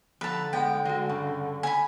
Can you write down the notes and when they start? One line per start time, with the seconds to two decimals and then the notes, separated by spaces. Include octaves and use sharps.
0.21 D3 F3 A4 B4 A5 A#5
0.53 G#3 B3 F#5 G5
0.85 G#3 F#4
1.09 G2 C#3
1.63 G#5 B5